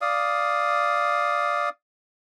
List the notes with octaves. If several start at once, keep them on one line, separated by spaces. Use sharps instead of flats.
D5 F5 D#6